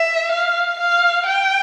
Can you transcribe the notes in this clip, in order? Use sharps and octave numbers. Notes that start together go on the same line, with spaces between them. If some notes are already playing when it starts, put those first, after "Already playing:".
Already playing: E5
F5
F5
G5